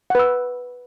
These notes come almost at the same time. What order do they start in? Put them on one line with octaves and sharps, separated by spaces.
F#5 B4 E6